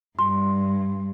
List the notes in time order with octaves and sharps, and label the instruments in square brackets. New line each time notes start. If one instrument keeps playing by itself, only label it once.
[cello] G2 [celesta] C6